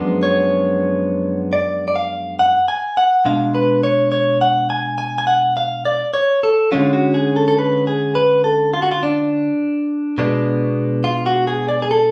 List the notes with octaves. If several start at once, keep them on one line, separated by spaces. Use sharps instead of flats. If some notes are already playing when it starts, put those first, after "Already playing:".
Already playing: F#2 F3 G#3 B3 D4
C#5
D5
D5
F5
F#5
G#5
F#5
B2 G#3 D4 F5
B4
C#5
C#5
F#5
G#5
G#5
G#5
F#5
F5
D5
C#5
A4
D3 G#3 C#4 F4
F#4
G#4
A4
A4
B4
G#4
B4
A4
F4
F#4
F4
D4
B2 G#3 B3 D4
F4
F#4
G#4
D5
G#4
A4